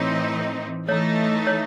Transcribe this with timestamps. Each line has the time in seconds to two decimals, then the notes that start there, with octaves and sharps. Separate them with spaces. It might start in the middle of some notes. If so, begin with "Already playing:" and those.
Already playing: A2 E3 C4 D#4 C#5
0.88 E3 A3 D#4 C#5
1.47 C#5